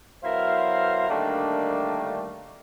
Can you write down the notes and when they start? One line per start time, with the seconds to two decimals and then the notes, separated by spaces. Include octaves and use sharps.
0.23 F#3 B3 E4 A#4 C5 F5
1.09 D3 D#3 G3 A3 A#3 D4